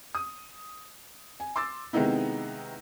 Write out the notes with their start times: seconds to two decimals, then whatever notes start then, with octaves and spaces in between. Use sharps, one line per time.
0.15 D#6
1.40 G#5
1.56 C6 D6 E6 A6
1.93 C3 D#3 G#3 B3 D#4 E4